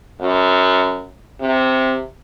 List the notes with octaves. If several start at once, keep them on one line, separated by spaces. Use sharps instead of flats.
F#2
C3